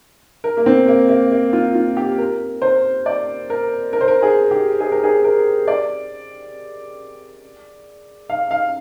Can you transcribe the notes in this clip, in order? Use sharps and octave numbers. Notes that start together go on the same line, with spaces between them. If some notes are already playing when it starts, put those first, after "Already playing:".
A#4
A#3
C4
A#3
A#3
A#3
F4
F4
G4
A#4
C5
D5
A#4
A#4
C5
A#4
G#4
G4
G#4
A#4
G#4
A#4
D5
F5
F5